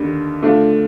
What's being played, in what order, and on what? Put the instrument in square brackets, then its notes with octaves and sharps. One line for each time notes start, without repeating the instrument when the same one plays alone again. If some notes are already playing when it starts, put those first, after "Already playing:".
Already playing: [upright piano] D#2 D3 G3 D4
D3 A3 D4 F4